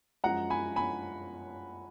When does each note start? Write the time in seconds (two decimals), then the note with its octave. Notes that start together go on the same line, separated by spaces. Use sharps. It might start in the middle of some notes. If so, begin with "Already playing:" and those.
0.24 F#2 F3 G#3 F#5 A#5
0.50 G#5 B5
0.76 G#5 B5